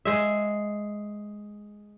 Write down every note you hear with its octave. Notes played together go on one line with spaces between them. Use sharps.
G#3 E5